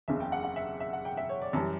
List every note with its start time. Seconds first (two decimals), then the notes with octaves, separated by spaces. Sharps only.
0.08 F#1 E2 C#3 E5
0.20 G5
0.32 F#5
0.44 F#5
0.56 E5
0.80 E5
0.93 F#5
1.05 G5
1.17 E5
1.29 C#5
1.42 D5
1.53 F#2 E3 G3 A5